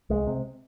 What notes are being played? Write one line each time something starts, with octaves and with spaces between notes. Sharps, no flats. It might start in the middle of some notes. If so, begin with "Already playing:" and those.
C2 G#3
C3